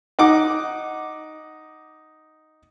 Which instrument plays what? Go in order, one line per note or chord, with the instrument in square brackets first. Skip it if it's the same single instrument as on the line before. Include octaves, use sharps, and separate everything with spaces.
[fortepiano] D#4 F#5 D6